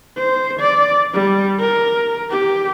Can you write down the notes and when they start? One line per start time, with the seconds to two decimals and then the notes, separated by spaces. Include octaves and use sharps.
0.17 C5
0.60 D5
1.14 G3
1.59 A#4
2.31 G4